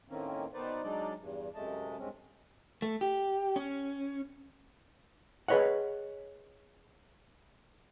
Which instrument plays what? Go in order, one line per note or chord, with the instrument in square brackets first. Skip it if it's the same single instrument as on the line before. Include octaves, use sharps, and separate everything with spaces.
[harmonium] A2 D#3 A#3 C4 C#4
B2 D#3 D#4 B4 C5 D5
F#3 G#3 D4 D#4 D5 D#5
E2 G2
F#2 C3 G#3 A3 D#5 A5
G2 G#3 C4 C#4
[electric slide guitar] A3
G4
C#4
[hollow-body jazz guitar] G#4 B4 C#5 D#5 F#5